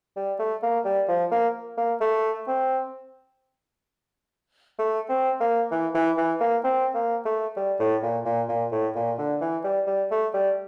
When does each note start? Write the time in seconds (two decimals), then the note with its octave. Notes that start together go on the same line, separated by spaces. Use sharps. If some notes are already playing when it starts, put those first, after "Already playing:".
0.17 G3
0.39 A3
0.63 A#3
0.85 G3
1.08 F3
1.31 A#3
1.77 A#3
2.01 A3
2.47 C4
4.79 A3
5.09 C4
5.40 A#3
5.71 E3
5.95 E3
6.18 E3
6.40 A#3
6.64 C4
6.94 A#3
7.25 A3
7.57 G3
7.80 A2
8.03 A#2
8.25 A#2
8.49 A#2
8.72 A2
8.96 A#2
9.18 D3
9.41 E3
9.64 G3
9.87 G3
10.11 A3
10.34 G3